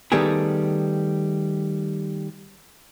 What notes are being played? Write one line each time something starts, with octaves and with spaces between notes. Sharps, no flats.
D#3 G3 A3 B3 G4 G#4